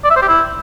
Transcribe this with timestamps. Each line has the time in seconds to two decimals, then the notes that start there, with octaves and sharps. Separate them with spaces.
0.05 D5
0.10 E5
0.16 C5
0.22 G4
0.28 E4